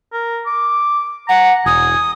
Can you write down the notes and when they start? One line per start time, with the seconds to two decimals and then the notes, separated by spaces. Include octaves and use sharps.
0.13 A#4
0.47 D6
1.28 F#5 A#5
1.66 E1 G#5 D#6